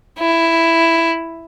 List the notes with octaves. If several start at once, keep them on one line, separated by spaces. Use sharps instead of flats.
E4